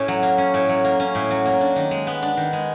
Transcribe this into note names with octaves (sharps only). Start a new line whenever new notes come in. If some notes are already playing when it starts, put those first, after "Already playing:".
Already playing: A2 C#4
F#3
A#3
C#4
A2
F#3
A#3
C#4
A2
F#3
A#3
D4
D#3
G#3
B3
D4
D#3
G#3